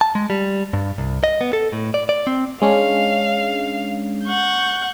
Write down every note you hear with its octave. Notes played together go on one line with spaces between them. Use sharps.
A5
G#3
G3
G2
C2
D#5
B3
A4
A2
D5
D5
C4
G#3 C#4 D4 F5
F#5 C#6 G6